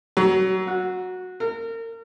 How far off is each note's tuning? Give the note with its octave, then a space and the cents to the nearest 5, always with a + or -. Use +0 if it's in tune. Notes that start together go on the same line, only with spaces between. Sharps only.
F#3 +25
F#4 -15
A#4 -35